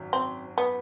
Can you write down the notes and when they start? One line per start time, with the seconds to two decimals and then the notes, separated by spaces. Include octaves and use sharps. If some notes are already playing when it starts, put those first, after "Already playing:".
Already playing: G#1 F#2 D#3 F#3
0.13 C4
0.58 B3